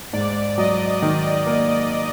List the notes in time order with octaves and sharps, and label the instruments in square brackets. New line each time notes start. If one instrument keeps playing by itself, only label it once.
[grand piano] G#2 [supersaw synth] D5
[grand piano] F#3 [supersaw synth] D#5
[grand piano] D#3
A#3